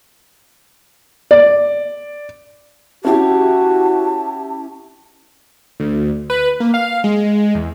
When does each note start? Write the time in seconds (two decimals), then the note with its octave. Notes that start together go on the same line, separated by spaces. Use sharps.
1.31 D5
3.05 C#4 E4 F#4 G4 A5
5.80 D2
6.30 B4
6.60 A#3
6.74 F5
7.04 G#3
7.55 E2